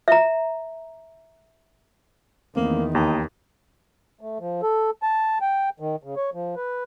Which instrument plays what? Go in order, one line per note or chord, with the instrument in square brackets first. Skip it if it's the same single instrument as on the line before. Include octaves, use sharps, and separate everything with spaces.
[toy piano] E5 A#5
[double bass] E2 D#3 [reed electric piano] E3 A3 C4 [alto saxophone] A#3
[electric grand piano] D#2 [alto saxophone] D#4 [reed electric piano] G5 A#5
[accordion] A3
F3
A4
A5
G5
D#3
C#3
C#5
F3
B4